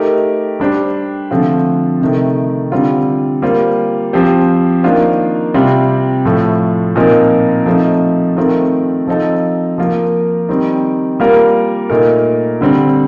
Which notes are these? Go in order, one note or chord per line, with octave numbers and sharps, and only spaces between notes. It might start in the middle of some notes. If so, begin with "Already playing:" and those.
Already playing: A3 D#4 G4 A#4
G3 D4 G4 C5
D3 F3 A3 C4 F4
C3 D#3 A3
D3 G3 C4 F4
G3 A#3 F4 C5
F3 C4 G4 C5
D#3 A#3 D4 F4 C5
C3 G3 C4 F4 C5
A2 F3 A3
A#2 F3 C4 D#4 A#4
F3 A3 C4 D#4
D#3 A3 C4 F4 A#4
F3 C4 D#4 A4
F3 A#3 F4 A#4
D#3 G3 C4
G3 A#3 F4 A#4
A#2 A3 D#4 A#4
D3 G3 C4